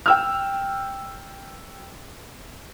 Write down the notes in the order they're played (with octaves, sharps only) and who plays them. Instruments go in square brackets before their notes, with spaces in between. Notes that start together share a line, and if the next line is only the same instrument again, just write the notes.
[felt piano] G5 E6 F6